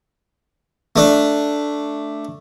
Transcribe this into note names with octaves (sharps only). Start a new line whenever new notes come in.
A3 D4